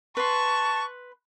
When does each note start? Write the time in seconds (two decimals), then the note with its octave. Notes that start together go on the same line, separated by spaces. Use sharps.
0.17 B4 A5 C6 C#6